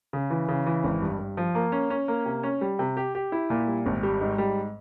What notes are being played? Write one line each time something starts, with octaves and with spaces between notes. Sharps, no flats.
C#3
E3
C#3
E3
G#1
G2
G2
F3
A#3
C#4
C#4
A#3
C3
C#4
G3
C3
G4
G4
E4
A#2
G3
G#1
G3
G#2
G3